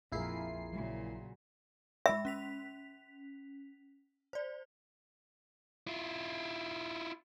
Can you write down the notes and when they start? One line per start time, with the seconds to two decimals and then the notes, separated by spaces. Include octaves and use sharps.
0.12 A#1 F2 E4 F4 G#4 A#4 C7
0.73 A#2 C#3 F#3
2.06 G#3 E5 B5 E6
2.25 C#4 B6 F7
4.33 C5 D5
5.87 E4 F4